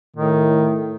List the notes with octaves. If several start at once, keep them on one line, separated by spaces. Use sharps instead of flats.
A2 D#3